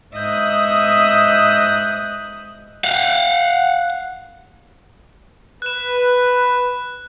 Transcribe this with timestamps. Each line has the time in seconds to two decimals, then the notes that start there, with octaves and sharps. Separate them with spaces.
0.14 G#2 D#5 E5 D#6 F#6 G6
2.84 F5 F#5
5.62 B4 F#6 E7